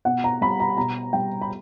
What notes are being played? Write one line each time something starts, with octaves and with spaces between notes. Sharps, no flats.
B2 F#5
A#5
G3 B5
A#5
B2 A#5
G3 G5
B5